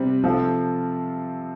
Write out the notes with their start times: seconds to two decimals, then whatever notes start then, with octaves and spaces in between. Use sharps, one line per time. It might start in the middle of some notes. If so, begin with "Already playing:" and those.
Already playing: C3 G3 C4
0.24 C3 F3 C4 F4 A4